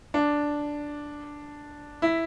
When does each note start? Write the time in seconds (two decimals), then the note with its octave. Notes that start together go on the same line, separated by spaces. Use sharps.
0.14 D4
2.02 E4